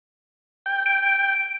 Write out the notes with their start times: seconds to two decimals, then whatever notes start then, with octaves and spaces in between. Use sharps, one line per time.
0.66 G5
0.86 D7